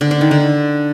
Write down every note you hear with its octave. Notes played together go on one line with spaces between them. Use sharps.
D3
D4
D#3
D3